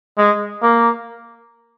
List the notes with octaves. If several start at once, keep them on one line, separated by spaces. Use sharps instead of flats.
G#3
A#3